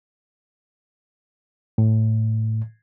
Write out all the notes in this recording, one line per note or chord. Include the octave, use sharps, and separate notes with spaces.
A2